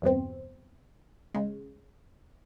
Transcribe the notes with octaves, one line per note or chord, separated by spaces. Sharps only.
E2 G2 B2 C4
C#3 G#3